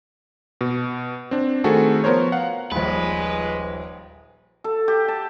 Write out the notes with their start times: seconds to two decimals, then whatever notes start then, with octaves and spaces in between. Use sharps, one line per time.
0.61 B2
1.31 C4 D4
1.64 D#3 A3 C4 F#4 G#4 A4
2.04 F3 B3 A#4 C5 C#5
2.32 F5 F#5
2.72 D#1 A#1 G#3 B4
4.64 A4
4.88 G4
5.08 A5